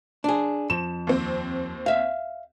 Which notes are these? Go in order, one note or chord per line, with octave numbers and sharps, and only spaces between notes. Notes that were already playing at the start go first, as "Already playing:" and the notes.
D4 G#4
F2 E7
D#2 C4
E5 F5